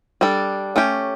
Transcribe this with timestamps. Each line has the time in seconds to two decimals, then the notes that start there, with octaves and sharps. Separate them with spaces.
0.21 G3 D4 A4
0.76 A3 C#4 G4